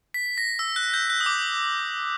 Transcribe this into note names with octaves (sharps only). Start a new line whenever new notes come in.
B6
A#6
E6
F#6
G6
F#6
D#6
D6